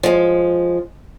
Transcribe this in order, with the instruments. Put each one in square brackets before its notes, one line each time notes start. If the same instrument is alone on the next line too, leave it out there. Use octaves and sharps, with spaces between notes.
[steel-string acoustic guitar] F3 G#3